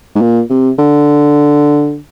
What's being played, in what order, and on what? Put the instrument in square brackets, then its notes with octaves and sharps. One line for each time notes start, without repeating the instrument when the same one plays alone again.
[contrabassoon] G#2
A#2
C3
D3